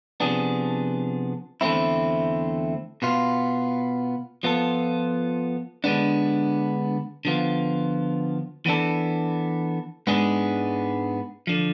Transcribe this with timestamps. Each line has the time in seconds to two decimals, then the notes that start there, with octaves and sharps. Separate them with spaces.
0.20 C3 F3 B3 D4 G#4
1.61 E2 D3 A3 C4 E4
3.02 B2 B3 F4
4.43 F3 B3 F4 A4
5.84 D3 G#3 B3 D4
7.25 D3 F3 B3 F4
8.66 E3 B3 D4 A4
10.07 G#2 G#3 B3 D4 G#4
11.47 D3 F3